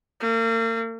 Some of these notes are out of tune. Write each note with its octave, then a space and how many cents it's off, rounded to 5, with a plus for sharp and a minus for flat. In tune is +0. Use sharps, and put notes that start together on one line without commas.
A#3 -40